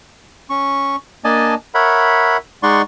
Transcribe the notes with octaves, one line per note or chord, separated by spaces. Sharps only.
C#4 C#6
A#3 D4 D5 D#5 G#5 A5
A#4 C#5 E5 F#5 B5
G#3 D#4 D5 F#5 C6 C#6